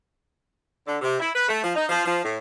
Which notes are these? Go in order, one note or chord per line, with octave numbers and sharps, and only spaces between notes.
D3
C3
E4
B4
A3
F3
D#4
F3
F3
A2